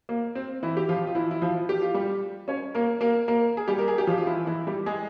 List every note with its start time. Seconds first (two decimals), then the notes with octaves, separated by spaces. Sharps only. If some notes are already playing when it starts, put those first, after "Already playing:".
0.09 A#3
0.35 C4
0.63 E3 E4
0.77 G4
0.89 F3 F4
1.07 F4
1.15 E3 E4
1.31 E4
1.42 F3 F4
1.69 G4
1.82 F4
1.94 G3 G4
2.48 C#4 C#5
2.74 A#3 A#4
3.01 A#3 A#4
3.28 A#3 A#4
3.57 G#4
3.68 G3 G4
3.79 A#4
3.88 G#4
3.98 G4
4.07 F3 F4
4.18 F4
4.27 E3 E4
4.47 E3 E4
4.67 G3 G4
4.86 G#3 G#4